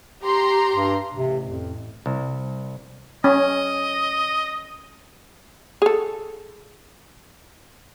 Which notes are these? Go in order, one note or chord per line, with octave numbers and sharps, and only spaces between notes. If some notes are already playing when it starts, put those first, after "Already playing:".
G4 A#5 C6
G2
A1 C3
F2
C2
C#4 D#5
G#4 A4